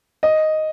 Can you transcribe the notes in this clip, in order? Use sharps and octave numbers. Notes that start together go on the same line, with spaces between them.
D#5